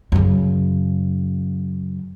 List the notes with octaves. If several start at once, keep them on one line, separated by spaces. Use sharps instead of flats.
F#2 C#3